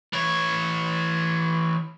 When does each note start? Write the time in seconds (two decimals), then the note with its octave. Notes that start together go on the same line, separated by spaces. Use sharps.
0.13 E3 C#5